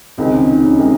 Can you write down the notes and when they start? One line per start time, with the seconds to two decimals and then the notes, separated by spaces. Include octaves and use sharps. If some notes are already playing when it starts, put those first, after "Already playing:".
0.18 C#2 C3 D#3 G#3 C4
0.34 C#4
0.49 D#4
0.64 C#4
0.78 C3 D#3 G#3 C#4